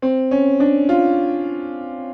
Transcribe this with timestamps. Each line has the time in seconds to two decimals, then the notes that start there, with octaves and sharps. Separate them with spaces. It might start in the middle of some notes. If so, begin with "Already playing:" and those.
0.02 C4
0.31 C#4
0.60 D4
0.89 F4